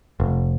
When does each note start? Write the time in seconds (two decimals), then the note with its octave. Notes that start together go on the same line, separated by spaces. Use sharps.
0.20 F1